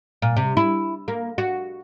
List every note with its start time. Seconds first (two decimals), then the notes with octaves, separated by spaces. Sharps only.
0.22 A#2
0.37 C3
0.57 E4
1.08 A#3
1.38 F#4